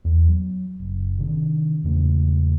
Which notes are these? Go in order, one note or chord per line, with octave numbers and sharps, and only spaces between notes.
E2
F#3
F#1
C3 D#3 D4
E2 G#2 C#3 A3